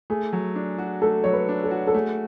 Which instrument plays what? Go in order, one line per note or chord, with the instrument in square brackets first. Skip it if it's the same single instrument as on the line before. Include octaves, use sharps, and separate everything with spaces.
[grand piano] A3 [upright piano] G#4
[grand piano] F#3
D4
F#4
[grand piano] A3 [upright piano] A4
[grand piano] F#3 [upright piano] C#5
[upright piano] B4
[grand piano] D4
[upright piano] A4
[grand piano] F#4
[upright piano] A4
[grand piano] A3 [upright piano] G#4